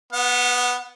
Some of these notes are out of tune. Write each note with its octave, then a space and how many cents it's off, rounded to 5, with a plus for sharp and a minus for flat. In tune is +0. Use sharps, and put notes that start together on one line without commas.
B3 +0 F#5 -35